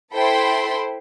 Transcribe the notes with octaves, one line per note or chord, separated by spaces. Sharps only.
E4 A4 C5 G5 B5 C6